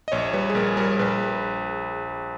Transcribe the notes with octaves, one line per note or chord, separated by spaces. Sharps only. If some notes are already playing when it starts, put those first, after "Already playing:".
D#5
A#1 C#5
G3 B4
G#4
A#1 A#4
G3 A#4
A#1 B4